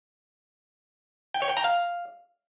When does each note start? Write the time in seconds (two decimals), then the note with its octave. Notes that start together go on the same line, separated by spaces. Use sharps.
1.34 G5
1.42 C#5
1.49 G5
1.57 A#5
1.64 F5